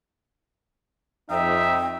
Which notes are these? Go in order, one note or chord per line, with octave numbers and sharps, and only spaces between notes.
F2 D#4 E5 G5